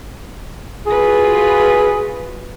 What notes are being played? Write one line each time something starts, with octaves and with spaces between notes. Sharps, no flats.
F4 F#4 G#4 B4